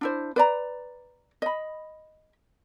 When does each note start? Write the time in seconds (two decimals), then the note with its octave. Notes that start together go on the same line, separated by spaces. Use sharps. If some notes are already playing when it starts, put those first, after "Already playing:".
0.01 D4 E4 C5
0.36 B4 D5 A#5
1.42 D#5 B5